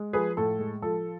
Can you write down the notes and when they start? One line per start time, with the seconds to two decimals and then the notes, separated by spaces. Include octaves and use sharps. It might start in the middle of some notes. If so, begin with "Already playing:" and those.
Already playing: G#3
0.13 F3 G#4 B4
0.37 A2 A4
0.59 G#3
0.82 F3 A4